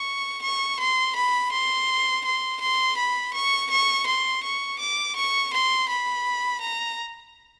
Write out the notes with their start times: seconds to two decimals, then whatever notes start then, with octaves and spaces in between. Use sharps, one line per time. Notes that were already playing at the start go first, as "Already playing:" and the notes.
Already playing: C#6
0.42 C#6
0.79 C6
1.15 B5
1.52 C6
2.25 C6
2.61 C6
2.97 B5
3.33 C#6
3.70 C#6
4.06 C6
4.43 C#6
4.80 D6
5.16 C#6
5.53 C6
5.89 B5
6.61 A#5